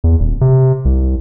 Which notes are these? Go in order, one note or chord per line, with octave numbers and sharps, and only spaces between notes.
E2
D#1
C3
C2